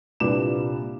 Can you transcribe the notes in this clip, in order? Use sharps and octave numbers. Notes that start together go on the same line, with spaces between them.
C2 A#2 D4 B4 D6 E7